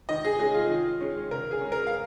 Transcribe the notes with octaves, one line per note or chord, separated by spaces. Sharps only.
D#3 D#5
G#4
G#3 C#4 G#4
F4
D#3
G#3 C#4
C#3 A#4
G#4
G#3 C#4
A#4
F5